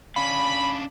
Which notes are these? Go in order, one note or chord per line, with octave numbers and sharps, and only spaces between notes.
C#4 D4 F5 B5